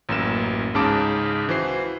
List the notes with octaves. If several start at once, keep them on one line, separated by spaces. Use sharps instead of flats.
A1 F#2 A#3 E7
C#2 G#2 C#3 A5 D6 D7
E3 F#4 C5 C7